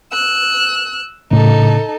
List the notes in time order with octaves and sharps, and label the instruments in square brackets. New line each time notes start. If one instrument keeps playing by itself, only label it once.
[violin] E6 F#6
[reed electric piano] A2 C#3 [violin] D#4 A4